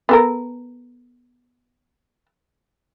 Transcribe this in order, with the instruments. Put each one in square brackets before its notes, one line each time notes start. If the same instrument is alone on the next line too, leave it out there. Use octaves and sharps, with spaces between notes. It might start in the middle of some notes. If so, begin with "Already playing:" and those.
[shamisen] B3 A4 A#4